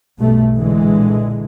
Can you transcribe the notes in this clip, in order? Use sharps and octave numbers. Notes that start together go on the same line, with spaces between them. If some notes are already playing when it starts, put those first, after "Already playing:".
B1 G2 A3
A#2 D3 E3 G#3